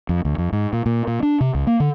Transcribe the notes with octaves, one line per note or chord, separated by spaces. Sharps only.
F2
D2
F2
G#2
A#2
A#2
A#2
D4
C3
C#2
A#3
D3